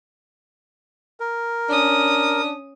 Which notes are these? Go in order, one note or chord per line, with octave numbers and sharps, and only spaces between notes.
A#4
C#4 D4 D#6